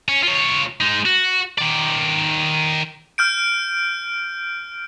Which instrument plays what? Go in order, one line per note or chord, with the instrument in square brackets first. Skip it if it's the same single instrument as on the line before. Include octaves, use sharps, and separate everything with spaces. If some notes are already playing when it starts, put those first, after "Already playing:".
[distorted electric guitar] C#4
F4 C#5
G#3 D#4
F#4
D#3 D5
[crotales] F6 G6 D7